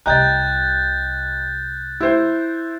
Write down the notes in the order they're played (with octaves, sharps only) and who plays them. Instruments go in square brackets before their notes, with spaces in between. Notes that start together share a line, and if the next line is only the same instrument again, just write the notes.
[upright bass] C2 C3 [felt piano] D#5 G5 A#5 [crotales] F#6 G6 A6
[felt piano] E4 C5